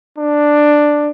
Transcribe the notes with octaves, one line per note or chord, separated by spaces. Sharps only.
D4